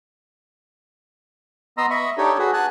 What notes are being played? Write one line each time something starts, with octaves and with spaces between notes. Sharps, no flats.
B3 D#5 A#5 C6 E6
D#5 E5 B5 C#6
D4 D#4 G4 A4 C#5
F#4 G#4 B4
F#5 G#5 A5 F#6